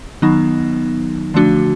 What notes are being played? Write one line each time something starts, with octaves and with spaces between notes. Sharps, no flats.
D#3 F#3 B3 D#4
D3 F3 A3 D4 F#4